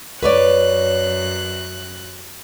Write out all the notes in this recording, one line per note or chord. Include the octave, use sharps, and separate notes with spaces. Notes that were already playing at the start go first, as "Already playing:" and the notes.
F#2 B4 C#5 D5 F#6